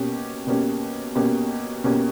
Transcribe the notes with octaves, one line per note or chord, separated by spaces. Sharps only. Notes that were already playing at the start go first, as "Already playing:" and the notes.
Already playing: B2 A#3 C#4 G4
B2 A#3 C#4 G4
B2 A#3 C#4 G4
B2 A#3 C#4 G4